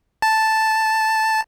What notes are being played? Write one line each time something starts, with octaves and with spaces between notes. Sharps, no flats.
A5